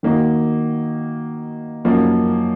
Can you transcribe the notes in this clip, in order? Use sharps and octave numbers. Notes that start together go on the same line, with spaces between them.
D#3 A#3 D#4 F#4
F#2 F3 A#3 D#4 F#4